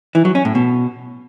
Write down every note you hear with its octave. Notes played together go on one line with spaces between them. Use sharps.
E3
F#3
C#4
A2
B2